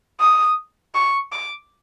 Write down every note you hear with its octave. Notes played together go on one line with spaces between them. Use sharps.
D#6
C#6
D6